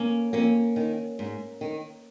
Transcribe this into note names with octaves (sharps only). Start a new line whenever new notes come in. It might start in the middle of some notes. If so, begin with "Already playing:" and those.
Already playing: A#3 C#4
F2 A#3 C#4
D#3
G#2
D#3